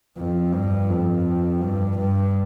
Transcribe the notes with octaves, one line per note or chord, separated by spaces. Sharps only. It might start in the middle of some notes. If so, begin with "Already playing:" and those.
F2
G2
F2
G2
G2